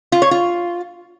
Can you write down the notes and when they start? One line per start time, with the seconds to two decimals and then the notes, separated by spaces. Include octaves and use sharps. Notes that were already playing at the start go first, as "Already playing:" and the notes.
0.12 F4
0.22 C#5
0.31 F4